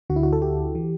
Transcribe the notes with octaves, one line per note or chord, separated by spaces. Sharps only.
D2 D3 F#4
E4
F#4
A4
G4
E3